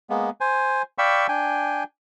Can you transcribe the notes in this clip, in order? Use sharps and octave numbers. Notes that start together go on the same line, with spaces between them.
G#3 A#3 B3
C5 G#5
D5 F5 G5 B5 C#6 E6
D4 G5 G#5